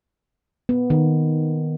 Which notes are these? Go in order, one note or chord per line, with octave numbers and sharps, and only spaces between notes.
B3
D#3